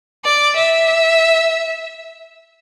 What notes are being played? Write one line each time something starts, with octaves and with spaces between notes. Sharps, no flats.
D5
E5